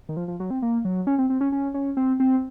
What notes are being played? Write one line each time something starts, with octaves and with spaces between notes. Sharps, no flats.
D#3
F3
F3
F#3
C4
A#3
F#3
C#4
C4
C4
C#4
C#4
C#4
C4
C4